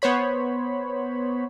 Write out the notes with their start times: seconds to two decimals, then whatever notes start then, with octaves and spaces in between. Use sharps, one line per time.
0.02 B3 C5 C#5 B5